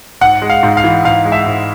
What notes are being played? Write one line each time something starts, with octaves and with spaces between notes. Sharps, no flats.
G#2 F#5
G#3
F5
G#2
F5
E3
G#2 F5
G#3
E5
G#2